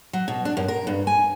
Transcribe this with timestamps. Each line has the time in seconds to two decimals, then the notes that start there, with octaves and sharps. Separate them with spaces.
0.13 F#3
0.28 B2
0.45 D4
0.57 F#2
0.68 A#4
0.87 G2
1.07 G#5